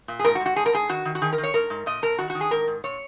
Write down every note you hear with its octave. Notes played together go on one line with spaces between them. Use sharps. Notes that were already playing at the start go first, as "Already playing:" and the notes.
A#2
G#4
G#2 A#4
F#4
G#2
F#4
G#2 G#4
A#4
G#2 G#4
D#3 F#4
D#3
F#4
D#3 G#4
A#4
D#3
C#5
G#2 A#4
G#2
A#2 D#5
A#2 A#4
D#3 F#4
F#4
D#3
G#4
G#2 A#4
G#2
A#2 C#5